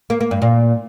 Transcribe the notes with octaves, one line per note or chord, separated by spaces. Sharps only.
A#3
A#3
G2
A#2